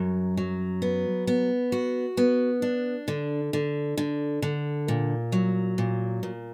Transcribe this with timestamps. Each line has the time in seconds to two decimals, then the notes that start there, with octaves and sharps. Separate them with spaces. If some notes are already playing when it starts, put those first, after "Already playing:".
Already playing: F#2 F#3
0.37 F#3
0.82 B3
1.27 B3
1.72 F#4
2.17 B3
2.62 D4
3.08 D3
3.53 D3
3.98 D3
4.42 D3
4.88 A#2
5.32 F#3
5.78 A#2
6.23 A#2